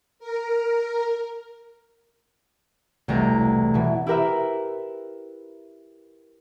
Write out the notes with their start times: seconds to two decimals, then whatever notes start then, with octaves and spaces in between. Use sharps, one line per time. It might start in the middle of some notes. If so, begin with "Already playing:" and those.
0.19 A#4
3.08 E1 C2 C3 A3 A#5
3.74 B2 E3
4.07 E4 G4 A#4 B4 E5